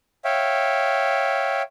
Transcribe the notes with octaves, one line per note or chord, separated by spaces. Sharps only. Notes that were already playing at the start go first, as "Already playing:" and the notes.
C#5 E5 F5 G5